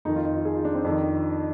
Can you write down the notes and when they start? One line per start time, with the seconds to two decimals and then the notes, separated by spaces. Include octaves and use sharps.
0.05 F2 D#3 D#4
0.16 F4
0.25 D#4
0.35 F4
0.45 G#4
0.55 F4
0.65 D4
0.74 C4
0.84 F2 D#3 D4